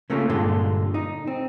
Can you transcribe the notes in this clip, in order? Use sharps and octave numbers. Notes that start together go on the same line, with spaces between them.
C#3 A3 A#3 C#4 F4
G2 A#2 D3 G#3 F4
D#4
C4